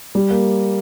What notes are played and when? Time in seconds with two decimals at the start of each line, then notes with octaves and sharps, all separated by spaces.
0.15 G3
0.30 A#3